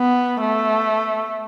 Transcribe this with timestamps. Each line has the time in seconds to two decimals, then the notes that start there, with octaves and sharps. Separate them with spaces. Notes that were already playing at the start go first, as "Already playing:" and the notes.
Already playing: B3
0.40 A3